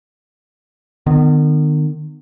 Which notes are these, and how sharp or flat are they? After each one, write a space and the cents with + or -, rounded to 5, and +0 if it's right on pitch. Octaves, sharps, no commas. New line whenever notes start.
D#3 -40 B3 +15